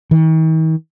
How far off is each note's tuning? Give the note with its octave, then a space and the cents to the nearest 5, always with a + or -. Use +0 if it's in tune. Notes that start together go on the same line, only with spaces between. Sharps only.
D#3 +45